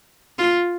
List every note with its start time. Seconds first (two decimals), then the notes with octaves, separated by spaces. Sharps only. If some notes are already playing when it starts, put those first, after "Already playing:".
0.39 F4